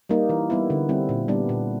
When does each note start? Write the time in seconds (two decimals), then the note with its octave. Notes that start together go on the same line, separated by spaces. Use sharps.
0.09 G3 A#3 D#4
0.29 E3
0.50 G3 B3 E4
0.70 D3
0.89 G3 C4 E4
1.09 A#2
1.28 G3 B3 D4
1.49 A#2